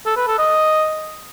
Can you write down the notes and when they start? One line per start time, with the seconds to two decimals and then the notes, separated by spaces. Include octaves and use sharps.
0.06 A4
0.17 B4
0.28 A4
0.38 D#5